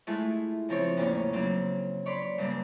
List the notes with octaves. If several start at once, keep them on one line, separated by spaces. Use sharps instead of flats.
G#3 A3 E4 F4
C#3 F3 C4 C#5
E2 A2 C#3 A#3 C#4
C#3 F#3 A#3 C4
C#5 D5 B5 C6
G2 C#3 A#3